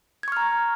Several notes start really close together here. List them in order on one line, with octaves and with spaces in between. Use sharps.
G#6 C#6 F6 A#5